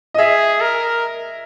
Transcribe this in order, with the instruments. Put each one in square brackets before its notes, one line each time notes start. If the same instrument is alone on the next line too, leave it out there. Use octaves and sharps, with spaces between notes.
[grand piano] D#5
[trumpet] G#4 [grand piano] E5
[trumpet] A#4